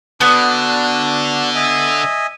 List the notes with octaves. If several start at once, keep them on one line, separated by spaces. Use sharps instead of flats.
D3 B3 D4 F#4
D#5 E5 G#5